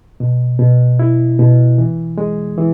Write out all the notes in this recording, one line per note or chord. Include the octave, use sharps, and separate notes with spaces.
B2
B2
E4
B2
E3
G#3
E3